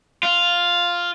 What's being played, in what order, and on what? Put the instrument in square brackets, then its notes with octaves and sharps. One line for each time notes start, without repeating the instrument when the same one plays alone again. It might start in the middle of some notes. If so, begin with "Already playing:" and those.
[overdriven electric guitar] F4